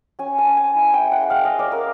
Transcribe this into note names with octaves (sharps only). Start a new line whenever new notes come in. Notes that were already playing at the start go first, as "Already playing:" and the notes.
C#4 G#5
A5
C#4
G#5
E4
G5
G#3
F#5
G#3 F5
D#5
C#4 D5
A#4